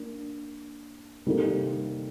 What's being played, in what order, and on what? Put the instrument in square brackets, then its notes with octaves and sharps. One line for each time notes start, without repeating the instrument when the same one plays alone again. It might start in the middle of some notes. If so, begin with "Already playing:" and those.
Already playing: [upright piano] A#3 D4
C3 G3 A#3 D#4 A4